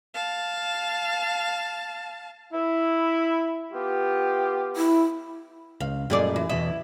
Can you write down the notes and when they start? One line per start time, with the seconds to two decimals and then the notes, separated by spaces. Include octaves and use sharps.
0.14 F5 A5
2.53 E4
3.73 B3 F4 G4
4.76 E4
5.80 C#2 F5
6.10 F#2 A#2 G3 A3 G#4 D5
6.36 E3
6.50 E2 B2 E4 D#5